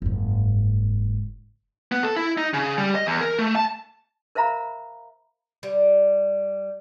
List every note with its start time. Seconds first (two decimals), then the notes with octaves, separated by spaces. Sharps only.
0.02 F#1 G#2
1.92 B3
2.03 A4
2.16 E4
2.37 D#4
2.54 C#3
2.78 G3
2.95 D#5
3.07 E2
3.21 A#4
3.39 A3
3.56 A5
4.35 A#4 C5 E5 F5 A#5 B5
5.63 G3